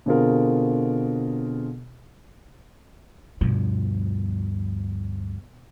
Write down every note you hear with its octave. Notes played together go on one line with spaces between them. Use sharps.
B2 D3 C4 F4 G#4 A#4
D2 G2 B2 F3